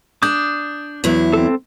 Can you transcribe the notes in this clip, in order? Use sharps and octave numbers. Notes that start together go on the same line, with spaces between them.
D4 D6 D#6 G6
E2 F#3 E4
C4 A4